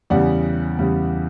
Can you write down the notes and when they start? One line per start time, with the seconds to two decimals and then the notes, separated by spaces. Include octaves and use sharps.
0.10 E2 C#3 G3 D5 F#5
0.79 E2 C#3 G3